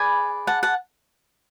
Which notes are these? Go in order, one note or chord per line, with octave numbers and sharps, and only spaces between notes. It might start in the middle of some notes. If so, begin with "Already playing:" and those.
Already playing: G#4 B4 D5 G#5 B5
F#5 A5
F#5 A5